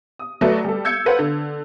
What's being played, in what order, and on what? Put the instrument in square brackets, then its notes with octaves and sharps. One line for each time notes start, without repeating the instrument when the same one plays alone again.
[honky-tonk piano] D#6
F#3 A3 F#4 A4 B4 D5
G3 A4
E6 G6 G#6 C#7
F4 A4 B4 C5 F5 F#5
D3